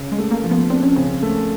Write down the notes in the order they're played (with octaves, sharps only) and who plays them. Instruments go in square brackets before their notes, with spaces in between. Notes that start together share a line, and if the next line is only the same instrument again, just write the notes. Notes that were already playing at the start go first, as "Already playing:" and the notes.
Already playing: [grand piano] C#3
[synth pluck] G#3
[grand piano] A3
[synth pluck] A#3
[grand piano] F3
[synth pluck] B3
[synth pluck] C4 [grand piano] D4
[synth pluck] C#4
[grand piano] C#3 [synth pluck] C4
[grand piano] A3